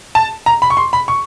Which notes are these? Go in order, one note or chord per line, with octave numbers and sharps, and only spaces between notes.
A5
A#5
B5
C#6
C6
B5
C#6